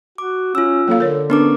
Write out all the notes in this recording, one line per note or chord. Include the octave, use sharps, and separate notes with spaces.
F#4 D6
C#4 F4 E6
F#3 A#3 A4 F5
D3 A#4 C#5
B3 C#4 D4 A#4 D6